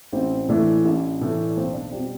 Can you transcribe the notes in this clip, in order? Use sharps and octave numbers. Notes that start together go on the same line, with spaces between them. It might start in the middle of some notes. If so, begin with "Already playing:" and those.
A1 C4
A2 E3 A3 D4
A1
A2 E3 A3
B1 C4
D4
B2 G3 C4